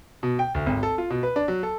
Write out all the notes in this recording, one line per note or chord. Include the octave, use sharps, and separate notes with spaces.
B2
G5
D2
G#1
A4
F4
B2
B4
D4
F#3
A4